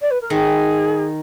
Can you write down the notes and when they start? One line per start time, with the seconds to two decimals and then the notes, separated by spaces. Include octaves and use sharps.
0.01 D5
0.10 B4
0.21 A#4
0.30 D#3 G#4